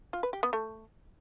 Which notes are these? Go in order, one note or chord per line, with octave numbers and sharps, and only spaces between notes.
F4
B4
G4
B3
A3